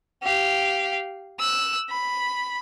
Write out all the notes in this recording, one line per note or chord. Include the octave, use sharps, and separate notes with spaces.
G4 F5
E6 F#6
B5